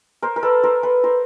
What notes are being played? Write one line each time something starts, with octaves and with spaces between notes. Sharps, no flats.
A#4 C5
A#4
A4 B4
A#4 C5
A4 B4
A#4 C5